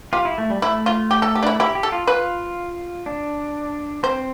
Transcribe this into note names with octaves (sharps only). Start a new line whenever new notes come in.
F4 G4
E4
A3
G3
A3 E4
F4
G4
A4
G4
D4
E4
E4 G4
G4
A4
F4
F4 B4
D4
C4 C5